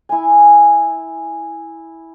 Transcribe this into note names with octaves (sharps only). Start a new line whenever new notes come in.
E4 G#5